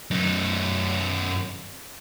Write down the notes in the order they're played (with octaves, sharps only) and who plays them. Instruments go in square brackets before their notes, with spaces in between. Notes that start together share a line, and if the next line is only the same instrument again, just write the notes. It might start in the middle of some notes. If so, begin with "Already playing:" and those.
[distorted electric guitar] F#2 D#4